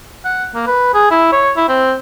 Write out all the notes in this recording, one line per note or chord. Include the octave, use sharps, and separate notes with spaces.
F#5
A#3
B4
G#4
E4
C#5
E4
C4